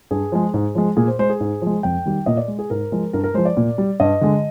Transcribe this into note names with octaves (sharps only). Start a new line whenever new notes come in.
G2 G#4
F3 G#3
G#2
F3 G#3
A#2 G#4
C5
G#3 C5
G#4
G#2
F3 G#3
F2 G5
D#3 G3
A#2 D#5
D5
G#3
G#4
G#2 A#4
F3 G#3
G2 A#4
A#4
F3 G#3 C5
D5
A#2
G3
G2 D#5
D3 G#3